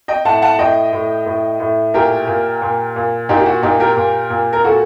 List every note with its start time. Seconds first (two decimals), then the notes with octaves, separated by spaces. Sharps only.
0.08 D#5 G5
0.25 A2 F#5 A5
0.42 F#5 A5
0.59 A2 D#5 G5
0.93 A2
1.26 A2
1.60 A2
1.94 A#2 G4 A#4
2.27 A#2
2.62 A#2
2.96 A#2
3.29 A#2 D#4 G4
3.40 G4
3.46 F#4
3.62 A#2 D#4 G4
3.80 G4 A#4
3.97 A#2
4.30 A#2
4.53 A#4
4.64 A#2 F#4 A4